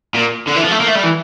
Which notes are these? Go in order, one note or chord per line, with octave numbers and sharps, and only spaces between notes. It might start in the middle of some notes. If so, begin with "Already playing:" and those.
A#2
D3
E3
F3
A3
A#3
A3
G3
E3